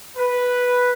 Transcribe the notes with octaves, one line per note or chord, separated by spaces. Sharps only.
B4